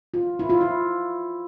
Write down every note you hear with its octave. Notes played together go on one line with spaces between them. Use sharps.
F4
E4
F4
E4